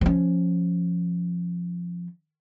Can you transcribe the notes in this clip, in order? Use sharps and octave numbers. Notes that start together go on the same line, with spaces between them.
F3 C#4